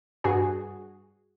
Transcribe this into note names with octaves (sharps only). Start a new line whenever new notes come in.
G2 F#4 G#4